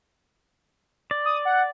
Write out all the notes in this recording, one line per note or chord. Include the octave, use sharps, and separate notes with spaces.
D5
D#6
F#5